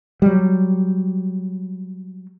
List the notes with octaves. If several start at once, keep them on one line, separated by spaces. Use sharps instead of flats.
F#3 G3